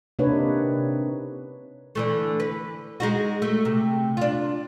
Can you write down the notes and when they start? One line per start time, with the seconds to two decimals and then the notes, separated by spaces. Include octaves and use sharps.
0.19 C3 A#3 D4 D#4 B4 C#5
1.95 D3 E3 A3
2.40 B4
3.00 G#3 D#4 F#4
3.42 A3
3.65 C3
4.17 D4 F4